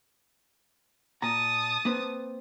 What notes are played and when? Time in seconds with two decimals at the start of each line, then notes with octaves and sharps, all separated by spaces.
1.22 A#2 A5 A#5 D#6
1.85 A#3 C4 B4